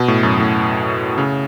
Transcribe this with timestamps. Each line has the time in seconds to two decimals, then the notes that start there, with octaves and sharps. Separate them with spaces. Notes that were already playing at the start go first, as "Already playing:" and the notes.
Already playing: B2
0.08 A2
0.23 F#2
0.40 A2
1.18 C#3